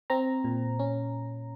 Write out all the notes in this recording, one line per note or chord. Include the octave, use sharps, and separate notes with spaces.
C4 A#5
A#2
C#4